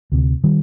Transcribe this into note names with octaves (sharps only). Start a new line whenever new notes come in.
D2 C3
D#3 G3